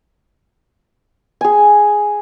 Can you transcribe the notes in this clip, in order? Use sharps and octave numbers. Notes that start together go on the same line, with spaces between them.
G#4 G#5